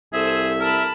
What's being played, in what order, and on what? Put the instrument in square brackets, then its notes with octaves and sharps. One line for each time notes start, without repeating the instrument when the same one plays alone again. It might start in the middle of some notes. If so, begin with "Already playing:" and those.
[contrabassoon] C2 [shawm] G#4 [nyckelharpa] A4 C5 [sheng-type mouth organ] E5
[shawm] A#4 [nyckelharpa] A5 B5